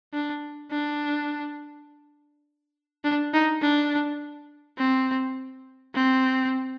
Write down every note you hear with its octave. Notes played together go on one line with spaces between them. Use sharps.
D4
D4
D4
D#4
D4
C4
C4